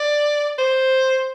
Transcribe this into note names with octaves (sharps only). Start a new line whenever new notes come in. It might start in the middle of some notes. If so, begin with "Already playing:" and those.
Already playing: D5
C5